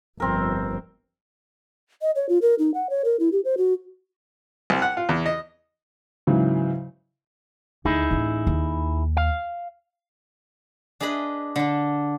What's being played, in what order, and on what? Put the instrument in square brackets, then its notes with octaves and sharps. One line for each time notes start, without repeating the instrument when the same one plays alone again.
[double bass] G1 F2 [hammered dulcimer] C4 A#4
[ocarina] D#5
C#5
F4
A#4
D#4
F#5
C#5
A#4
E4
G4
C5
F#4
[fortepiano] C2
F#5
F4
E2
D#5
[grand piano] G#2 C#3 E3 F#3
[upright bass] D2 [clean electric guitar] D#4 E4 G#4
[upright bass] A1 A3
D#2
[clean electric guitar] F5
[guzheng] D4 G#4 B4 D#5 B5
D3 D4